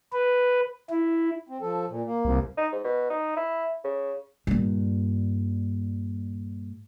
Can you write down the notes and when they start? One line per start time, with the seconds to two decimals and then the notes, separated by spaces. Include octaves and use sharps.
0.13 B4
0.90 E4
1.49 C4
1.62 F3 A4
1.89 A#2
2.06 A#3
2.25 C2
2.57 D#4
2.72 G#2
2.84 B2
3.10 D#4
3.36 E4
3.84 C#3
4.47 G2 A#2